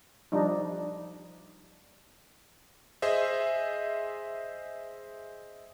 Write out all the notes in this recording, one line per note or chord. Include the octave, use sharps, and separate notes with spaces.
F3 G3 D4 D#4
G#4 C5 D#5 E5